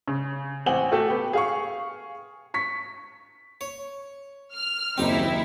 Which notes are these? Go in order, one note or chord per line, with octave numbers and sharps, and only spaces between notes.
C#3
A1 C4 F#5 G#5 F#7 G7
A3 F#4 G4 A4
B3 G4
G#4 F5 C#6
C#6 B6
C#5
F6
F#1 D#2 C4 D#4 E4 G4